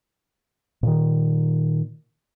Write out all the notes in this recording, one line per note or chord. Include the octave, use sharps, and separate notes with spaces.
A#2 D#3